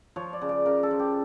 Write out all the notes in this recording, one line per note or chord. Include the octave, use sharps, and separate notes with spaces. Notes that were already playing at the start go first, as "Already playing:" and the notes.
F3 C#5
D5
C#3
D5
C#3 A#4
A4
F3
G4